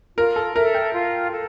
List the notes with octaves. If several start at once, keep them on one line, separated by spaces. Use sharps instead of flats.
F4 A#4
A4
A4 A#4 E5
G5
F4
A4